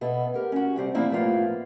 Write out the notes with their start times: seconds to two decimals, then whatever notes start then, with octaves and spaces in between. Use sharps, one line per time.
0.01 B2 B3 E5
0.34 G4 A#4
0.52 C#4 F#4
0.76 C3 G3 C4
0.95 F3 G3 A#3 C4 E4
1.10 A2 F3 A#3 B3 F4